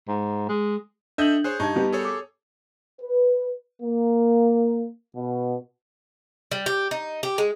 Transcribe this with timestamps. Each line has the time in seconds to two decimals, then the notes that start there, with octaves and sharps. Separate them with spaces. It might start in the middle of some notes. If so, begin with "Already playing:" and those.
0.08 G#2
0.49 G#3
1.18 D4 A4 D#5 E5 D#6 G6 F#7
1.44 G#4 C5 C#5 F#6
1.60 G2 D#4 D#5 A5 C#6 G#6
1.76 G3 B3 G4
1.93 G#4 A4 C#5
2.05 D6
3.00 B4
3.82 A#3
5.15 B2
6.51 G3
6.66 G4
6.91 D#4
7.23 G4
7.38 G#3